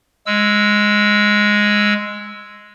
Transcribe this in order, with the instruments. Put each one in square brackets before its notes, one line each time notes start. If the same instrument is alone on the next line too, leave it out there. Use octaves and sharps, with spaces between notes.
[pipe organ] G#3 E6